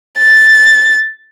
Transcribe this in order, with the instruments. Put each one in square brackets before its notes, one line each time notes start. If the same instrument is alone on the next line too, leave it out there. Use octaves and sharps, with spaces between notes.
[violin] A6